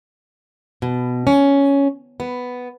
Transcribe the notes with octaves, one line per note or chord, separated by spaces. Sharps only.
B2
C#4
B3